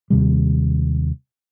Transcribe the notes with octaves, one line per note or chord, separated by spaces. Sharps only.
D#2 C3 G3